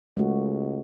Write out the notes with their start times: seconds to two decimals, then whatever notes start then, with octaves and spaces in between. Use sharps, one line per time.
0.17 C#2 G#3 A3 F#4